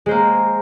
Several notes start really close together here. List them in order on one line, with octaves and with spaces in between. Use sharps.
G#3 C5 A#3